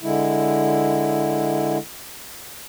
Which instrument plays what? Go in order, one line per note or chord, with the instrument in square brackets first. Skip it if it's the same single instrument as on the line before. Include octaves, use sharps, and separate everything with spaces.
[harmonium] D3 G#3 E4